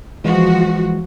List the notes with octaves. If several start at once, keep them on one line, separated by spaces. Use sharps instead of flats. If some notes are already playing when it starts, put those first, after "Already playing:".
E3 F3 G#3 F#4